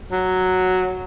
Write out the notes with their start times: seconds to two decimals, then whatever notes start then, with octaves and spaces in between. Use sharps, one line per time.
0.12 F#3